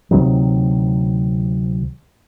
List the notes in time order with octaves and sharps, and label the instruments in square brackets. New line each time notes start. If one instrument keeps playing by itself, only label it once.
[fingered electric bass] D2 C3 D#3 F#3